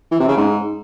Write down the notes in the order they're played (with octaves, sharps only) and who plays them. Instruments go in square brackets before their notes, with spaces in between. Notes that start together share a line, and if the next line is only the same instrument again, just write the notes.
[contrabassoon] E3
C3
C#3
G#2